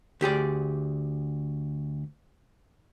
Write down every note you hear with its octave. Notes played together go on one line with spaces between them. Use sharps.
D2 G4 G#4 D5